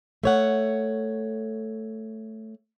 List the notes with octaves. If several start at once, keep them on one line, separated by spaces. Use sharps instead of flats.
A3 C#5 F#5